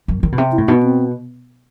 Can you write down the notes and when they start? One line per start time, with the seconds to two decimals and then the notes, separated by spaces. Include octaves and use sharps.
0.08 F#2
0.23 D#3
0.32 B2
0.37 C3 C4
0.52 E4
0.58 A2
0.68 B2 D#4
0.83 C4